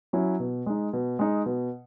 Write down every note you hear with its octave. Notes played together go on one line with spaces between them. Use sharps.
F#3 C#4 E4
B2
G#3 D#4
B2
G#3 D#4
B2